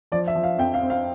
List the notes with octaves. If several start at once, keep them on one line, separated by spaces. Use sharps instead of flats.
F3 D5
E5
F3
F5
F2 G5
F5
C4
F5